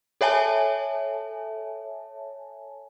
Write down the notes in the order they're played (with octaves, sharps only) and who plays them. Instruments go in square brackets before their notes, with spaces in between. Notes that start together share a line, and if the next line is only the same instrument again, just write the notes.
[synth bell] A4 C#5 E5 G#5 A5